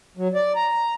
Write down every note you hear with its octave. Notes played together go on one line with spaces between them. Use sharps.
F#3
D5
A#5